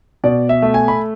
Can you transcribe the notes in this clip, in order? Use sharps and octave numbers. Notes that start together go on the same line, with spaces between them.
B2 D5
E5
A3
G#5
B5